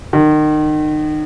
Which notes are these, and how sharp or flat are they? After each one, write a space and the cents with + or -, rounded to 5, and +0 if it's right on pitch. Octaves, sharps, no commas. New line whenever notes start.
D#3 -30